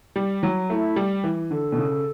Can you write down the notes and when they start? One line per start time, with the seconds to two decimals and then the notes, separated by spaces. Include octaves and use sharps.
0.16 G3
0.43 F#3
0.69 A3 E4
0.96 G3
1.24 E3
1.51 D3 A4
1.72 B2
1.78 C#3